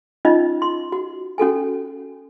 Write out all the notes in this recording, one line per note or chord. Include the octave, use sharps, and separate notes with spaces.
C#4 D#4 F4 D#5
C6
F#4
C#4 F#4 A4 G#5